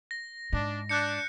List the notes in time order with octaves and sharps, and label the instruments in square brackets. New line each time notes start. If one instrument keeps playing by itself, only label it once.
[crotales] A#6
[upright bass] G#2 [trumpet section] D4
[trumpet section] D4 [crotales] F#6 G6 C#7